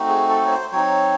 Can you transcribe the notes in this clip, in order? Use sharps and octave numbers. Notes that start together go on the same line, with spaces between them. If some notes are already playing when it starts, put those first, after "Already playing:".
Already playing: A3 C4 D#4 F#4
G#4
A4
C#5
C5
F#3 C4 D#4 C#5